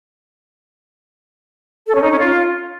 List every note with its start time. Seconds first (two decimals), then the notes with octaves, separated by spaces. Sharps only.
1.86 A4
1.94 C#4
2.02 D#4
2.10 C#4
2.18 F4